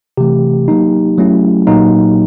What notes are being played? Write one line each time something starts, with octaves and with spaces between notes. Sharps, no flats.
C3 E3 A3 G4
F#3 A#3 D#4
F#3 A3 C#4 E4
A#2 F#3 A#3 D#4